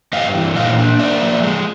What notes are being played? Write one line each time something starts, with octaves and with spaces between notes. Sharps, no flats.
G2 D#5 F5
E3
A#2 D#5 F5
D4
A#3 D5 E5
F3
G#3